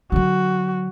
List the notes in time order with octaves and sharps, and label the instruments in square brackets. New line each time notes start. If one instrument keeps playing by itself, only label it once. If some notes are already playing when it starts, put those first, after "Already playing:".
[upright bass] D3 F#3 [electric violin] F#4